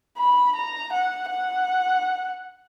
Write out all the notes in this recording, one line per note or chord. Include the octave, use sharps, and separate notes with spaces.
B5
A#5
F#5
F#5